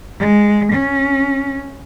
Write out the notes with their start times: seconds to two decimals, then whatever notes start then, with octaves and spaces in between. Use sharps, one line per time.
0.18 G#3
0.71 C#4